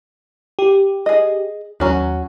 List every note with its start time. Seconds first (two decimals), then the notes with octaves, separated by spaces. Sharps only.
0.59 G4
1.06 G#4 D#5
1.80 D#2 F#3 C#4 F#4